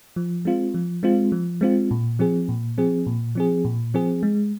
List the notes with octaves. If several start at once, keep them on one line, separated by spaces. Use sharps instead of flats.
F3
G#3 C4 F4
F3
G#3 C4 F4
F3
G#3 C4 F4
A#2
F3 C4 G#4
A#2
F3 C4 G#4
A#2
F3 C4 G#4
A#2
F3 C4 G#4
G#3